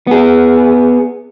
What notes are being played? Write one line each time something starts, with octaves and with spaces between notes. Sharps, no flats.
B3 G#4